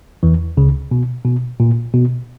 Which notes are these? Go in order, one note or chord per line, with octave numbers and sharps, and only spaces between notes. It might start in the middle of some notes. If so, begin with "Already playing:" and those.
E2 E3
C#2 C#3
B2
B2
A#2
B2